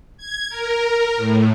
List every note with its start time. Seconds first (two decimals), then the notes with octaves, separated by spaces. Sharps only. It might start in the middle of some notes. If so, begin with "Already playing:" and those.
0.18 G#6
0.49 A#4
1.17 A2